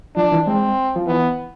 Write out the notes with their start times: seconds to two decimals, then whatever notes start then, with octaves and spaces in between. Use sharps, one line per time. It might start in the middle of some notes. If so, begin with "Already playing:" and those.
0.16 F3 D4
0.32 E3
0.47 G#3 C4
0.96 F3
1.07 E3 B3